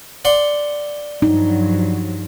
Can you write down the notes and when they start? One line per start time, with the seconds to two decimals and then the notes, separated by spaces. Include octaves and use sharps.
0.25 D5 F#5 C6
1.22 G2 F3 F#3 D#4